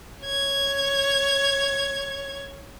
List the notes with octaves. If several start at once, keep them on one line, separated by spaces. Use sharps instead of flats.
C#5 G#6